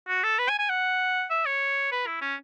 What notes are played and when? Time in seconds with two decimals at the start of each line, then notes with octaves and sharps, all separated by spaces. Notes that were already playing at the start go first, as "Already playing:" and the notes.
0.08 F#4
0.24 A4
0.39 B4
0.49 G#5
0.59 G#5
0.69 F#5
1.30 E5
1.46 C#5
1.92 B4
2.07 E4
2.22 C#4